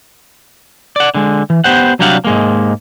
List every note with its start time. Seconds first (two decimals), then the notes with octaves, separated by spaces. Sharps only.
0.96 D5 F#5
1.15 D3 G#3
1.50 E3
1.64 B3 G4 C5 F#5
1.99 C2 F#3 G3 D4 F5 F#5
2.25 G#2 G#3 A#3